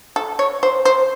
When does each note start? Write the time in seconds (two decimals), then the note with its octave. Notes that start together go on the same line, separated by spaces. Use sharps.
0.16 A4
0.39 C#5
0.63 C5
0.85 C5